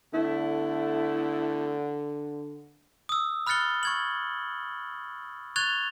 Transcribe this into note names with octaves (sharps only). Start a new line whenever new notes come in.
D3 A3 B3 E4
D#6 E6
B5 F6 F#6 A6 C#7 G7
C#6 G#6 F#7
C#6 F#6 G#6 A6 F7 G7